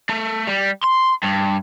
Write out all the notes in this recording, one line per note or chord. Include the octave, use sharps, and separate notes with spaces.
A3
G3
C6
G2